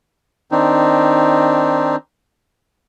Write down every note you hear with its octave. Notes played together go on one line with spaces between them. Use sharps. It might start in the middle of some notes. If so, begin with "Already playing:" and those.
D#3 C4 D4 D#4